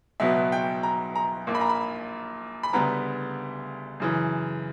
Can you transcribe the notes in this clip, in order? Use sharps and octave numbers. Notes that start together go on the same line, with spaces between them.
C#2 B2 F#3 B3 E5
G5
A#5
A#5
A#1 A#2 A#3
B5
A#5
B5
B5
D2 C#3 G3 B3 A#5
F#2 C#3 E3